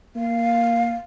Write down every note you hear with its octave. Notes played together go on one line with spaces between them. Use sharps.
A#3 F5